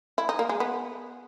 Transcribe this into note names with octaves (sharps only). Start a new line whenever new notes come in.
E4
D#4
A#3
G#3
B3